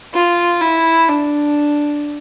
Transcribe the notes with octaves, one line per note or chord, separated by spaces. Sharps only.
F4
E4
D4